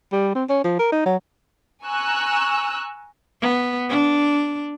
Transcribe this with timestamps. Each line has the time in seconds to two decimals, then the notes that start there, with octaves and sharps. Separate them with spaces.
0.12 G3
0.35 C4
0.49 C#4
0.64 F3
0.79 A#4
0.92 D#4
1.06 F#3
1.85 G#5 A#5 C#6 E6 F#6
3.41 B3
3.89 D4